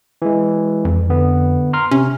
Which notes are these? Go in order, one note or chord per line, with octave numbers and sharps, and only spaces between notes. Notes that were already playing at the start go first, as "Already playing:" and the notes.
E3 G#3
F2
D3 B3
A#5 C6 F6
C3 C#4